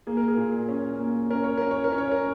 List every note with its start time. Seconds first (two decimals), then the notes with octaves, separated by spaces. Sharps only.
0.07 A#3 G#4
0.17 A#4
0.28 G#4
0.37 A#2
0.69 C#4
0.99 A#3
1.30 C#4 A#4
1.44 C#5
1.58 C#4 A#4
1.71 C#5
1.84 A#4
1.92 C#4
1.98 C#5
2.12 A#4